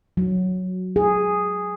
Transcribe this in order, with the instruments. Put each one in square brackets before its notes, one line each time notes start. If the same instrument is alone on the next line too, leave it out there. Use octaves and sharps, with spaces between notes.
[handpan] F#3
G#4